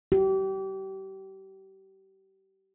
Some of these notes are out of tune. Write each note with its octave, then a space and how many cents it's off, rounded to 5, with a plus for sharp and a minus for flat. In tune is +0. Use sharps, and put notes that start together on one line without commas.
G4 -30